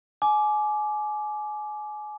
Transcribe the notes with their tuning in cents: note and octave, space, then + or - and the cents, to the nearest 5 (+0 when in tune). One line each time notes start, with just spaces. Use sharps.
G#5 +30 D6 +0